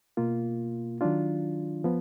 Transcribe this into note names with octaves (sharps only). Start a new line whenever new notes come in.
B2 A#3 F4
D#3 F#3 D4 F4
F3 B3